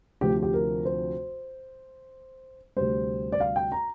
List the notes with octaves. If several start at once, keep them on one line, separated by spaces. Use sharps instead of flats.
D2 C3 F3 C4 G4
G4
A#4
C5
D2 C3 G3 C5
D5
F5
G5
A#5